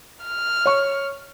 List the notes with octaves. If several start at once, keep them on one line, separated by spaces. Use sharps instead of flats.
F6
C#5 C#6